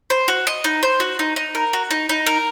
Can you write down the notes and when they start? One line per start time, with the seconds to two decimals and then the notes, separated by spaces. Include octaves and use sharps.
0.10 C5
0.28 F#4
0.47 D#5
0.64 D#4
0.83 C5
1.00 F#4
1.19 D#4
1.36 D#4
1.55 A#4
1.73 F#4
1.91 D#4
2.09 D#4
2.26 A#4